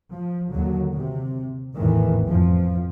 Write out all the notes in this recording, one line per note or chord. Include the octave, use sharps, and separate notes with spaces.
F3
D#2 D3 F#3
C3
G#1 E2 A2 D#3 E3
F2 F3